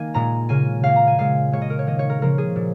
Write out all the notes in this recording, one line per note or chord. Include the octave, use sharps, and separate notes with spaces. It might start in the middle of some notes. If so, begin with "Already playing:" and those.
Already playing: D#3 A#3 G#5
A#2 G#3 A#5
C#3 A#3 G#5
C#3 A#3 F5
A#5
G#5
A#2 G#3 F5
C#3 G#3 C#5
D#5
A#4
C#5
D#3 A#3 D#5
C#5
A#4
C#3 F3 A#3 A#4
G#4
A#2